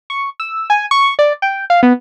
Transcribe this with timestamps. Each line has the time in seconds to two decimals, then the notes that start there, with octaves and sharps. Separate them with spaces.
0.10 C#6
0.40 E6
0.70 G#5
0.91 C#6
1.19 D5
1.42 G5
1.70 F5
1.83 B3